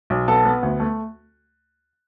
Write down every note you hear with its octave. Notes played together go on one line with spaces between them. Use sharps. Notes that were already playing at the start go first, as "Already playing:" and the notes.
B1
B3 A4 A5
B3
D2
A3